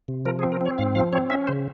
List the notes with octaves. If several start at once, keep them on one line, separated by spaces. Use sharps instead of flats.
C3
F3 A#4
G#4
C4
A#4
C4 C#5
G#2 F5
F3 F5
C4 C#5
C#4 E5
C#3 C5